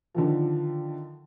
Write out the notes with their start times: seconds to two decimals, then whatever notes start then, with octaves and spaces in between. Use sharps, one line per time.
0.14 D3 D#3 F3